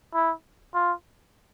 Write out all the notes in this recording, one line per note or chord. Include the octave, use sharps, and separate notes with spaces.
E4
F4